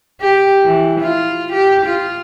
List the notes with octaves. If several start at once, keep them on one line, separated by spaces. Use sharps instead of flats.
G4
E3
F4
G4
F4